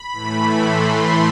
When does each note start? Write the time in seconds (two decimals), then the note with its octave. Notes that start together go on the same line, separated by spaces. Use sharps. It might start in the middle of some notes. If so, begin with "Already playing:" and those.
Already playing: B5
0.12 A2 E3 A3
0.58 C6